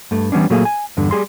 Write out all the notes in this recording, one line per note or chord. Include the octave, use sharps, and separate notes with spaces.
G2 A3
E3 G3 B3 C#4 D4
A#2 F#3 A3 A#3 G#4
G#5
E2 G2 D3
G3 G#4 C6